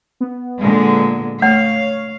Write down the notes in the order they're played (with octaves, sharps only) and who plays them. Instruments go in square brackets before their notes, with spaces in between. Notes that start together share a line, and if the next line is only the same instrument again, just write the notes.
[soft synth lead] B3
[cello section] A#2 D3 G#3
[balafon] A3 [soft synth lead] C#5 [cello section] F5